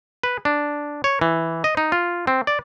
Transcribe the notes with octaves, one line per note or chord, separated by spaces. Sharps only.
B4
D4
C#5
E3
D#5
D#4
F4
C4
D5